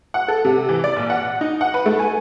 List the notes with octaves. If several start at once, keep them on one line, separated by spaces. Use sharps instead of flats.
F#5
A4
C3
E3
D5
A#1
F#5
D#4
F#5
B4
A3
G#5